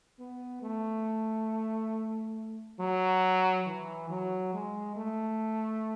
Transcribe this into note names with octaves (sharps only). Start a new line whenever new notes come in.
B3
A3
F#3
E3
F#3
G#3
A3